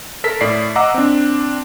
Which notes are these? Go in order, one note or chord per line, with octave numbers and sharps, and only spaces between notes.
A4 A#4 B6
A2 D5 C7
D#5 F#5 A#5 D6 E6
C4 D4